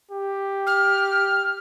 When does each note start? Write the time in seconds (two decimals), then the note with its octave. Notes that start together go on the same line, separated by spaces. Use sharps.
0.11 G4
0.66 F6